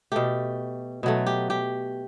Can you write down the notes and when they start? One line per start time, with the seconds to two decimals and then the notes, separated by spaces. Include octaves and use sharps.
0.12 B2 A3 G4
1.03 B2 F#3 A3
1.26 G4
1.50 G4